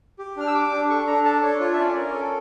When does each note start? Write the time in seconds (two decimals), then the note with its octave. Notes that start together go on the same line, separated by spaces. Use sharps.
0.19 G4
0.37 D4 F6
0.47 E6
0.54 G4 D6
0.72 D4
0.90 A4 C#6
1.07 D4 A#5
1.25 A4 A5
1.43 D4 C#5
1.60 F4 C#5
1.73 E5
1.78 C#4 D5
1.88 C#5
1.96 C#4 A#4
2.14 A4